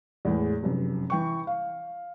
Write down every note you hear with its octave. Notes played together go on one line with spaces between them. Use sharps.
E2 A2 G#3
F1 F#2
E3 G5 C#6
F5